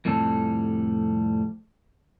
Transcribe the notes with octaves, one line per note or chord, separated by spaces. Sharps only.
F2 A2 C3 G3 A4